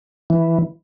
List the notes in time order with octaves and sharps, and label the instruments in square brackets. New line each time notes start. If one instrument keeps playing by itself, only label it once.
[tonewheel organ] E3